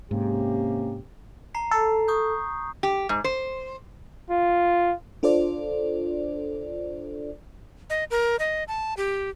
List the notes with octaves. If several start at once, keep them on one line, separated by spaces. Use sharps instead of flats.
G#2 C3 A#3 C#4 G4
A5 A#5 C7
A4
C#6 D#6 G6
G4
G#2
C5
F4
D4 F4 A4 C5 D5
D#5
A#4
D#5
A5
G4